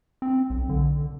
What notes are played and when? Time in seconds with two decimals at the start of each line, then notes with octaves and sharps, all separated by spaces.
0.22 C4
0.50 B1
0.69 D3